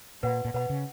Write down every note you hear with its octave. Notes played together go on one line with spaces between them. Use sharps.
A#2 B4 F#5 B5
A#2
B2 B4 F#5 B5
C#3